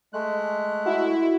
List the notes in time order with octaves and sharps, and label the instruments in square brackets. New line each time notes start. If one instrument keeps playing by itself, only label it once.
[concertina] G#3 A3 F#6
[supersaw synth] E4 [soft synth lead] F#4